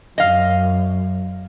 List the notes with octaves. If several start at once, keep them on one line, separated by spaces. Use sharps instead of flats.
F#2 D#5 F5